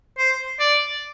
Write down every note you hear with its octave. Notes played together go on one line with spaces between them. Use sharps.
C5
D5